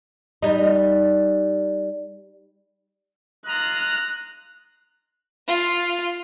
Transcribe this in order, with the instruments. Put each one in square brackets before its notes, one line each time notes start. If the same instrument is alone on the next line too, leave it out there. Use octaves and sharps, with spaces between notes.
[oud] G3 D#4
[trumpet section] F4 D#5 A#5 [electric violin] F#6
[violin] F4